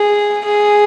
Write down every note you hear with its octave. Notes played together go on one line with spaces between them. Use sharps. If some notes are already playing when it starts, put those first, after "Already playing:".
Already playing: G#4
G#4